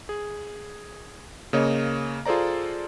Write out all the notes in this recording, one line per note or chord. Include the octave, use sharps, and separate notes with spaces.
G#4
C#3 A#3 C#5 D#5
F4 G#4 A4 C5 D5 A#5